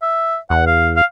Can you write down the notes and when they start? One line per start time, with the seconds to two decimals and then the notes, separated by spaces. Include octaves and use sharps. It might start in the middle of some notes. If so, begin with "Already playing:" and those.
0.02 E5
0.50 E2 F#5
0.67 F5
0.96 F5